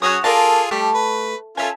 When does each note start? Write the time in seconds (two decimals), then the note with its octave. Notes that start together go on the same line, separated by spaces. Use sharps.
0.02 F#3 C#4 F#4 G#4 C#5 D#6
0.24 A#3 F4 G#4 A4 D5 A5
0.71 G3 A3 G4
0.95 B4
1.57 C#4 F4 A4 E5 G#5